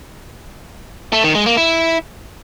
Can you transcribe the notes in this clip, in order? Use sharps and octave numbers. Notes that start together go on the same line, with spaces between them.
A3
D#3
G#3
A#3
E4